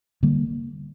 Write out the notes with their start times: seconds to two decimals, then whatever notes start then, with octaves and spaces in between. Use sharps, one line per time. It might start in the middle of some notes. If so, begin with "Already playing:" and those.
0.23 D3 G3 A#3